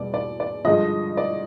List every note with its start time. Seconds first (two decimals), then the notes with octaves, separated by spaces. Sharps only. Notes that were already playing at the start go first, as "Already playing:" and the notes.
Already playing: E2 B2 G3 D5
0.14 D5
0.40 D5
0.65 G2 D3 F3 G#3 D#5
1.17 D5